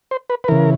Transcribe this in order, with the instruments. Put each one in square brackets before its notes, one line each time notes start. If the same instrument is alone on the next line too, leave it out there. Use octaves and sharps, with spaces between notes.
[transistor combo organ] C5
B4
B4
C#3 E3 A#4